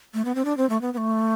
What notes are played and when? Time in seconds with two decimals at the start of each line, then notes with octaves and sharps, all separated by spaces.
0.14 A3
0.25 B3
0.35 C4
0.45 D4
0.57 C4
0.70 A3
0.81 B3
0.93 B3
0.97 A3